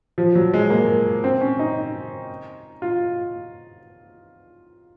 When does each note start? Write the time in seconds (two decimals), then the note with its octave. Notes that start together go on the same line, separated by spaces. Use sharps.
0.18 F3
0.35 F#3
0.54 G#3
0.70 A#3
1.24 C4
1.41 C#4
1.59 D#4
2.82 F4